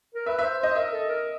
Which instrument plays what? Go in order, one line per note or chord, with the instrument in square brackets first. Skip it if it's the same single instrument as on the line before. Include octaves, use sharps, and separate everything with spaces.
[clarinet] A#4
[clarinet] B4 [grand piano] E5
[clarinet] C5 [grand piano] E5
[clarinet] C5 [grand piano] D#5
[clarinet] A#4 [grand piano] E5
[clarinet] A4
A#4